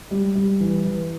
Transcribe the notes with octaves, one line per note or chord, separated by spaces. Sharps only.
G3
G3
E3
E3